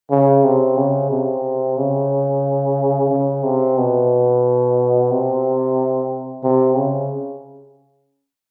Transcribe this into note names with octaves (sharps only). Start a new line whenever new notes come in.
C#3
C3
C#3
C3
C#3
C#3
C3
B2
C3
C3
C#3